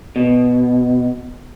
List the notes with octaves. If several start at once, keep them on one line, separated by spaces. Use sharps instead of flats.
B2